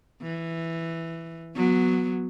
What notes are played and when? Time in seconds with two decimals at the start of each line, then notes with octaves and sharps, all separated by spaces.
0.22 E3
1.55 F#3 B3